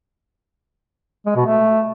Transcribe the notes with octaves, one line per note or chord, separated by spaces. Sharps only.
G#3
B2
A3